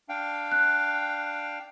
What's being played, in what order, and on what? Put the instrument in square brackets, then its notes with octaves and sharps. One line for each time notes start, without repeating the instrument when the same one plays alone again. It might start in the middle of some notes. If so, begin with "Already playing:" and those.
[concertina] D4 F5 G5
[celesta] F#6